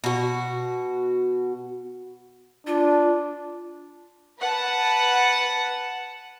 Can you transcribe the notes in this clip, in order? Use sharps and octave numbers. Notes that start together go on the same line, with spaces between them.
B2 F#4
D4 F4
B4 F#5 A5